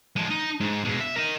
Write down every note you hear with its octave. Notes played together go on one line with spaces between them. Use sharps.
F3 G#3
D#4
G#2
B2 G#3
E5
A#4 D#5